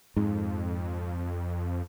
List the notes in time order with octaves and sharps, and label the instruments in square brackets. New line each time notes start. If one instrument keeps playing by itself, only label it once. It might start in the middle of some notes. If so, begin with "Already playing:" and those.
[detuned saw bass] F2 [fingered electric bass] G#2